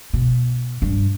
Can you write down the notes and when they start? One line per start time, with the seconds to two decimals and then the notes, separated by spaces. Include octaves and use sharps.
0.13 B2
0.82 G2